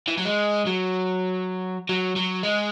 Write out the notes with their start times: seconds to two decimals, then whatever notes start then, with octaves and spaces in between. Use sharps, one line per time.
0.08 E3
0.18 F#3
0.25 G#3
0.66 F#3
1.89 F#3
2.16 F#3
2.43 G#3